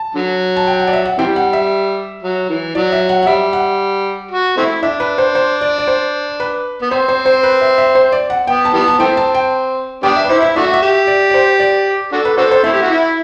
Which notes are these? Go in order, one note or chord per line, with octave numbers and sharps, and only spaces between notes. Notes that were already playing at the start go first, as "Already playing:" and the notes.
Already playing: A5
D3 F#3
A5
G5
F#5
D5
E5
F#5
C3 E3 G3 G5
F#5
E5
F#3
E3
F#3 D5
E5
F#5
F#5
G3 E5
F#5
F#4
A3 C4 E4
D4 E5
B4
C5
C5
D5
D5
C5
B4
B3
C4 C5
C5
C5
B4
E5
E5
C5
D5
F#5
B3 G5
A5
E3 G3 B3
A5
E3 A3 C4 G5
A5
G5
G3 B3 D4 G5
E5
B4
E4 C5
E5
A3 D4 F#4 E5
F#5
E5
G4
D5
D5
C5
D5
D4 F#4 A4
B4
D4 F#4 A4 C5
C5
A3 C4 E4 E5
G4
F#4
E4